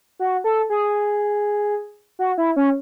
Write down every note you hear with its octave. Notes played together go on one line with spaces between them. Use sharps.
F#4
A4
G#4
F#4
E4
C#4